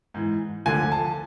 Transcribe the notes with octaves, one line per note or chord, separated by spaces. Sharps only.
G#2 E3
D2 D3 F3 G#5
A5